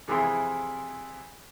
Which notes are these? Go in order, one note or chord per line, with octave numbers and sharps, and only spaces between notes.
F2 C3 E3 E4 G#4 C6